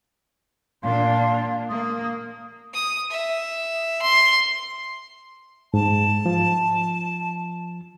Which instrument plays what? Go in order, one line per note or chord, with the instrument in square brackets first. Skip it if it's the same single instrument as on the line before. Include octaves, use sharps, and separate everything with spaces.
[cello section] A#2 D4 [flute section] F5 A5 C6
[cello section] A#3 [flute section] D#6
[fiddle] D#6
E5
C6
[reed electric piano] G#2 [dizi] A5
[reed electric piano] F3